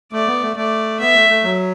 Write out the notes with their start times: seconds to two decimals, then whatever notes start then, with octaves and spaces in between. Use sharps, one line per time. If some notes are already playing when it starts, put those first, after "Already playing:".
0.12 A3 D5
0.27 B3
0.42 A3
0.56 A3 D5
1.00 B3 E5
1.15 A3
1.30 A3
1.44 F#3